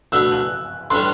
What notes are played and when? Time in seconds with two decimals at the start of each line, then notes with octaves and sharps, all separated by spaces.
0.12 B2 A3 D4 E6
0.32 F#6
0.90 A2 G3 B3 D4 A4 C6